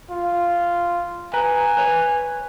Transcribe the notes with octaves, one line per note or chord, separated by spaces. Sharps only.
F4
B4 G#5 A#5
B4 C#5